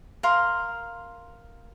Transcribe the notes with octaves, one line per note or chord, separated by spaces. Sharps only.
A#4 F5 C6